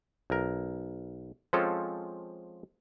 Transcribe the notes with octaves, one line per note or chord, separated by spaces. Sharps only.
B1 A#4
F3 G#3 C4 C#4 F4 A4